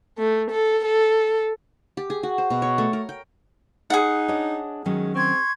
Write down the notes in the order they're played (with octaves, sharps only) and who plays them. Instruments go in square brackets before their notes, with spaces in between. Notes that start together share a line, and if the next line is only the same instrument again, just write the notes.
[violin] A3
A4
A4
[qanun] G4
G#4
F#4
C5
B2
C#5
A3
A#4
G5
[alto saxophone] D#4 [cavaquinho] G#4 F#5
[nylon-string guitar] D4 C#5 D#5
[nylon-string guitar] D#3 F#3 C#4 [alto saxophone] G#3
[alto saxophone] C4 [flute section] C6 C#6 G#6